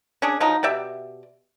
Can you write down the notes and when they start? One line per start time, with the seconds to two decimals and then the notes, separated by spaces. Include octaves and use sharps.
0.22 C#4 D4 G#4
0.40 F3 F#3 D#4
0.63 B2 G4 D5 E5